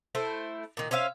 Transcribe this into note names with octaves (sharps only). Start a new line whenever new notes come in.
A3 E4 C5
A#2 D#3
C#4 C5 E5 F5